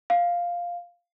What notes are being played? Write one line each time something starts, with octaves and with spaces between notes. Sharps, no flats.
F5